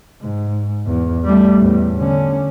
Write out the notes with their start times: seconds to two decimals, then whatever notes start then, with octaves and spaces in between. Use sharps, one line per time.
0.22 G#2
0.86 E2
1.25 G3 A3
1.59 E2 A2
1.96 D3 C#4